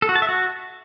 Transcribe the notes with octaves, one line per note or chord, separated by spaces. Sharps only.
A4
F#4
A5
E5
F#4